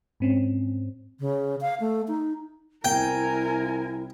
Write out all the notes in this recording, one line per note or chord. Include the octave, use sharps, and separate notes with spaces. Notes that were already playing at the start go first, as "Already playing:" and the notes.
G#2 C4 C#4
C#3
F5
A3
D#4
C2 E4 A#4 G5 G#5